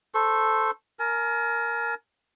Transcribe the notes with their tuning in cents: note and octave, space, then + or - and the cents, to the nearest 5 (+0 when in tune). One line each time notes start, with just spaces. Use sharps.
A4 +0 C5 -15 C#6 -30
A#4 +0 G#5 +35